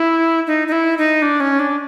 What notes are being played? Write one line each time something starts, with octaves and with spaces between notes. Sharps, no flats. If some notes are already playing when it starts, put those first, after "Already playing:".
Already playing: E4
D#4
D#4
E4
D#4
D4
C#4
D4